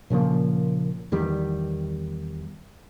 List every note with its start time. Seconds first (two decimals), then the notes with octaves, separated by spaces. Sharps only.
0.10 A#2 C#3 F3 A#3
1.12 E2 D#3 G3